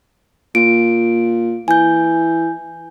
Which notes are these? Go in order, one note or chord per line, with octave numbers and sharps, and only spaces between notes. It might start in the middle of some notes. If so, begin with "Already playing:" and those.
A#2 D7
E3 G#5 G6